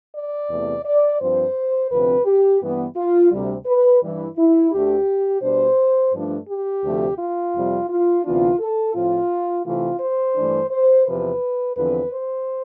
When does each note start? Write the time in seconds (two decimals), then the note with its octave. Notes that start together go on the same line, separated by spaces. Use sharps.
0.14 D5
0.50 E2 C3 E3 A3
0.85 D5
1.20 G2 F3 C4 C5
1.91 D2 C3 F3 C4 B4
2.26 G4
2.61 G2 E3 G3 B3
2.96 F4
3.31 D2 C3 G3
3.66 B4
4.01 G2 E3 G3
4.37 E4
4.72 D2 D3 A3 G4
5.42 B2 G3 D4 C5
6.14 G2 F3 A3 D4
6.48 G4
6.83 D2 C3 F3 A3
7.18 F4
7.54 F2 C3 G3
7.89 F4
8.24 D2 C3 E3 B3 D4 F4
8.59 A4
8.94 A2 F3 C4 F4
9.65 C3 E3 A3 C4 F4
10.00 C5
10.35 G2 E3 A3 D4
10.71 C5
11.06 E2 C3 F3 B4
11.76 E2 D3 F3 C4 B4
12.11 C5